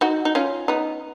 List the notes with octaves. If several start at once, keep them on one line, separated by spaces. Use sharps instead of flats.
D#4 F#4
D#4
C#4 F4
B3 D#4